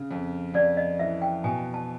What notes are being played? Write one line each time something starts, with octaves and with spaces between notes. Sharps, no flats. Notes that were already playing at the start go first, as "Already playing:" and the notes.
Already playing: C#3
F2
F2 D5
D#5
E3 E5
G5
B2 G#5
A5